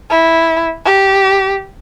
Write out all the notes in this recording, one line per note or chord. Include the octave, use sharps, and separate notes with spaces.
E4
G4